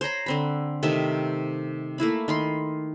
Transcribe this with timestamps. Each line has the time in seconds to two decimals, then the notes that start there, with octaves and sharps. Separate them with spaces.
0.01 C5 C#5 A#5 B5
0.26 D3 C4 B5
0.83 C3 D#3 A3 E5
1.98 A3 A#3 E4 B5
2.28 D#3 B5 C6